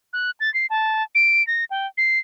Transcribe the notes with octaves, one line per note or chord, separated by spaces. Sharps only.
F#6
A6
C7
A5
D7
A#6
G5
C7